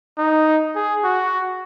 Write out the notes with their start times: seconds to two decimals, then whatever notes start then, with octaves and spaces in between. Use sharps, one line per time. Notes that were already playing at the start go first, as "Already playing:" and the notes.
0.18 D#4
0.75 G#4
1.04 F#4